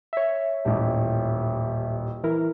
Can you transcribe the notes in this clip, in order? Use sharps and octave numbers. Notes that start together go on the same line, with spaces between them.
C#5 E5
D#1 A1
E3 E4 A#4